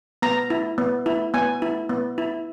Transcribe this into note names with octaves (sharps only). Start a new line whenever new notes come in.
B3 A#5
E4
B3
E4
B3 G#5
E4
B3
E4